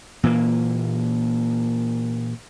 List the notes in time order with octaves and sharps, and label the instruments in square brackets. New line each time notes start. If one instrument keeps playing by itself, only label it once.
[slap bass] A#2 E3 A#3